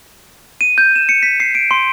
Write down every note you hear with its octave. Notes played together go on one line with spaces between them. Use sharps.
D#7
G6
E7
C#7
B6
C7
D7
C6